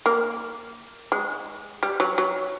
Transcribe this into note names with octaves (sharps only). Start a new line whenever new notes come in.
A#3
G#3
G3
F#3
F#3